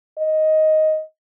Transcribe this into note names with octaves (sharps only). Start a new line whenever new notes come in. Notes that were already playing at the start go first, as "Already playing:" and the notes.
D#5